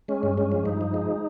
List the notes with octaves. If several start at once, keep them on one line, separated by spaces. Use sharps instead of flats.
G#3 C#4
G2
G#3 C#4
F3
G2 D#4
F3
G#3